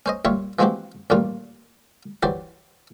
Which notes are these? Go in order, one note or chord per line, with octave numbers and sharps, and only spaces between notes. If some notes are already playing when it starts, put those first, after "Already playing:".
C#4 C5 D#5
A#1 G3 F4 C#5 E5
E3 F3 G#3 C4 F#4 G4
A1 D#2 A#2 G3 A#3 F4
E3 F#3 G4 C5 D5